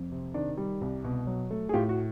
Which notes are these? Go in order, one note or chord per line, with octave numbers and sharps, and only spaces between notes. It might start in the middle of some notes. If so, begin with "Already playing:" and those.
Already playing: F2
C3
D#3 D4
G3
C2
B2
F#3
A3
G#4
A2 F4 G4
F#4